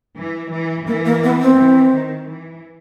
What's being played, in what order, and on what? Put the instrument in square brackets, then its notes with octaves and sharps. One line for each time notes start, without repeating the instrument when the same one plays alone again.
[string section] E3
E3
[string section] E3 [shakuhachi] A#3
[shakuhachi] A#3
B3
C4
[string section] E3
D#3
E3